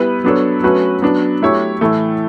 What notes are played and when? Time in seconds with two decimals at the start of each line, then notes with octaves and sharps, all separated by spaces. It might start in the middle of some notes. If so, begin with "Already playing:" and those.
Already playing: G3 B3 E4 B4
0.24 F#3 B3 D4 A4 C#5
0.62 F#3 A3 C#4 F#4 B4
1.02 F#3 B3 D4
1.42 F#3 A3 E4 G4 C#5
1.81 A2 E3 A3